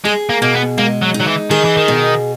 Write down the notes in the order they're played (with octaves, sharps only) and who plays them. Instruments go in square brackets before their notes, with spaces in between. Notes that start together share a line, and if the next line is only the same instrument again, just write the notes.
[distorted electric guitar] G#3 [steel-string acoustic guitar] G#4
[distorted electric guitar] A#3
[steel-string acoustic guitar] B2 [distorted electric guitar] A#3
[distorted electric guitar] B3
[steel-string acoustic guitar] G#3 [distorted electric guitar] A#3
[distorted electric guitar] F#3
[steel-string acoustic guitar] D#4
[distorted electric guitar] F#3
E3
[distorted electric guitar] D#3 [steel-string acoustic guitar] G#4
[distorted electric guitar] E3
D#3
[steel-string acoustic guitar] B2